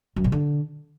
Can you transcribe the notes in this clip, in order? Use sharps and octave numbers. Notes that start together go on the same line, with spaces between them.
F#2
B2
D3